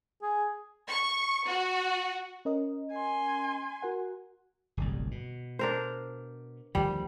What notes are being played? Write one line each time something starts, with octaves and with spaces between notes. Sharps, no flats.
G#4
C#6
F#4
C#4 A#4 D#5
G#5 C6
F#4 A#4 F#5
D1 G1 C2
B2
D4 A#4 C5
D2 D#3 F3 G3